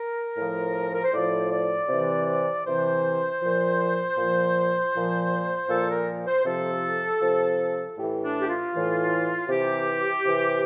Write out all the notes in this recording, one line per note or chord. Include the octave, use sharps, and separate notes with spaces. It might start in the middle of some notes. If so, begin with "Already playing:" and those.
Already playing: A#4
A2 F3
A#4
C5
A2 F3 D5
D5
C3 E3
C3 E3 C5
A#2 F3
A#2 F3
A#2 F3
A#2 F3 A4
A#4
C5
C3 F3 A4
C3 F3
A2 E3 G4
D4
G4
F4
A2 E3
C3 E3 G4
C3 E3